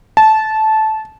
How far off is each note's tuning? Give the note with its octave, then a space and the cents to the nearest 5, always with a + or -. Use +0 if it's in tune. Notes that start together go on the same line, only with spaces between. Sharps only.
A5 -15